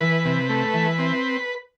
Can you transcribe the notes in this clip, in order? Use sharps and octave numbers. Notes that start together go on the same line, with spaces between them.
E3 B4
C3
A3
E3
C4